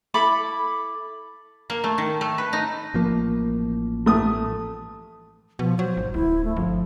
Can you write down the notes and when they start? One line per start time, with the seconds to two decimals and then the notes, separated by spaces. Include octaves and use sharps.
0.14 E4 A4 B5 D6
1.70 A#3
1.84 A3
1.98 D#3
2.21 A3
2.38 B4
2.53 D#4
2.94 A1 F3 A#3
4.06 A3 D#6
5.59 B2 F3
5.79 F#3 C5
5.97 G#1
6.14 D1 E4
6.45 A3
6.56 G1 F3